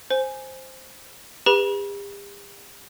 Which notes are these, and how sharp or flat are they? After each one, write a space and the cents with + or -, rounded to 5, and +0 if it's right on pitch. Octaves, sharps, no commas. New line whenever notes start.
C5 +0 G#5 +0
G4 +45 B4 +0 B5 -40